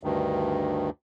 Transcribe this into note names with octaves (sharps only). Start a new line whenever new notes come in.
D2 G2 D#3